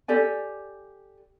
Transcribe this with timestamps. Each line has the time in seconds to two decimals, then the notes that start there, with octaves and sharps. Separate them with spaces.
0.08 G4 A4 D5 G#5